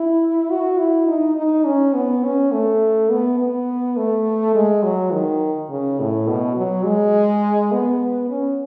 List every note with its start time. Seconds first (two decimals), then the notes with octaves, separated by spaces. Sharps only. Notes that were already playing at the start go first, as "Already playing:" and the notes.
Already playing: E4
0.51 F#4
0.79 E4
1.08 D#4
1.37 D#4
1.65 C#4
1.95 B3
2.24 C#4
2.52 A3
3.10 B3
3.39 B3
3.97 A3
4.55 G#3
4.84 F#3
5.13 D#3
5.70 C#3
6.00 A2
6.28 B2
6.57 F#3
6.85 G#3
7.72 B3
8.30 C#4